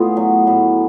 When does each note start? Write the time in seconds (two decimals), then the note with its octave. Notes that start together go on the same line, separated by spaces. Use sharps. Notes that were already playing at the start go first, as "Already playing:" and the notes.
Already playing: A2 B3 F4 G#4
0.17 F#3
0.47 A2